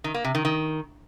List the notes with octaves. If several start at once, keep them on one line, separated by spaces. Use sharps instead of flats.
D#3
A#3
C3
D#3
D#3